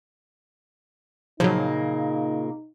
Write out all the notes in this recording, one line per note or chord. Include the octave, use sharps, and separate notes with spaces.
A#2 C#3 F3 F#3 A#3 D#4